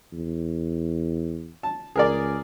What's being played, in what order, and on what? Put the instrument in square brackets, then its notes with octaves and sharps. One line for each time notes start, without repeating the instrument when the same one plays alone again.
[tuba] E2
[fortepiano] A5
[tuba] C#2 [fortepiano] G#4 A#4 D5